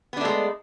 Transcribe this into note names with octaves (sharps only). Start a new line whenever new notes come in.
G#3 A3 B3 D4